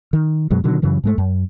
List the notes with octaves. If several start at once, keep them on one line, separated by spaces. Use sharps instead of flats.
D#3
F#2 B2 F#3 G#3
B2 D3 D#3 F#3
F#2 C#3 E3 F#3
G#2 G#3 A3
F#2